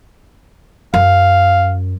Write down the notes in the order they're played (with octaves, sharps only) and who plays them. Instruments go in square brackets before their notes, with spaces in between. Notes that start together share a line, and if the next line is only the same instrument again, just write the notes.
[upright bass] F#2 [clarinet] F5